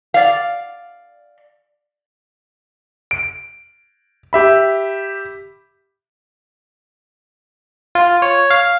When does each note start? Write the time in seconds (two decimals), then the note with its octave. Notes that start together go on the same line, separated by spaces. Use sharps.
0.14 D5 F5
3.11 D7
4.33 G4 E5 B5
7.95 F4
8.22 C#5
8.50 F5